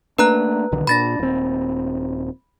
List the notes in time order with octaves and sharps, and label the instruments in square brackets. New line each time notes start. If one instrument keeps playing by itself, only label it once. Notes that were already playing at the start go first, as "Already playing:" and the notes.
[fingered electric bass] A3 A#3 D4 [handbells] B4 A#5 F#6
[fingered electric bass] B1 D3 D#3
[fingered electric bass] A#2 D4 [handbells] B5 A6 A#6
[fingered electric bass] D#1 C4